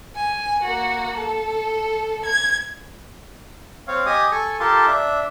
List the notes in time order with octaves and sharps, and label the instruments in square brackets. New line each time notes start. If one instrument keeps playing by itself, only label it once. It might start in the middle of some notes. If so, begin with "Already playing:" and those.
[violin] G#5
A#3 F#4
A4
G#6
[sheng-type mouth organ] C4 C#5 F5
G4 D#5 G#5 D#6
A4 G#5 C#6
F4 G4 A4 A#4 A5 C6
D4 E5